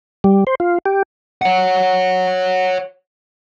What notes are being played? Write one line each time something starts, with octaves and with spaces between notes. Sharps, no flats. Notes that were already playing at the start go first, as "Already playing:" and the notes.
G3
C5
F4
G4
C#5 F#5